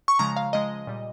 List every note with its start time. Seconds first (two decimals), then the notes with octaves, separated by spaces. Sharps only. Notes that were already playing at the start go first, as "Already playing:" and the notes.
0.08 C#6
0.19 C#3 F3 G#3 A#5
0.36 F5
0.53 C#3 F3 G#3 D#5
0.87 A#2 G3